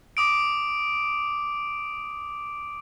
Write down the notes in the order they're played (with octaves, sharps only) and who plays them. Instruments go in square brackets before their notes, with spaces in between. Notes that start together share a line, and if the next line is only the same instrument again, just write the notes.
[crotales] D6 D#6 D7